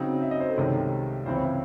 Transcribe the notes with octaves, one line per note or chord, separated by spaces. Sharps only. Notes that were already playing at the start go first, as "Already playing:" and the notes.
Already playing: C#3 F#3 C4 D#4
E5
D#5
C5
A4
C2 C3 D#3 G#3 C#4
C#2 C#3 E3 C4 C5
C#5
E5